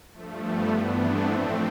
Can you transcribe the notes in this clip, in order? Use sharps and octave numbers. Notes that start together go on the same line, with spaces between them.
G2 F3 A3
G3 B3
G2 E3 B3 D4
A3 C4
A2 F3